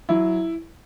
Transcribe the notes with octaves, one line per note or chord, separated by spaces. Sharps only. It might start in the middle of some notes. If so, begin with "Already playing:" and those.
F#3 E4